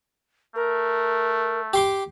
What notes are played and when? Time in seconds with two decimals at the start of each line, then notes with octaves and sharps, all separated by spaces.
0.55 A3 A#4
1.73 G4 C6 D6